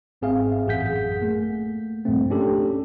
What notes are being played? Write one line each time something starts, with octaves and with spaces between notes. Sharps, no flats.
G1 G#2 C4 G#4 E5 F5
A1 F#2 G#4 F#5 G6 B6
A3 A#3
C2 G2 A#2 F3 A3 C4
A3 C#4 D4 G4 A4